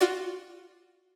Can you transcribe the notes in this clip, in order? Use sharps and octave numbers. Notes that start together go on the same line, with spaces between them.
F4 F#4 D5